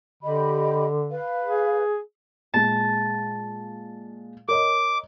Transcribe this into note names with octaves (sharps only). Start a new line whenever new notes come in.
D3 G4 D#5 B5
B4 F5
G#4
A#2 G#3 A5
A#4 C#5 D#5 D6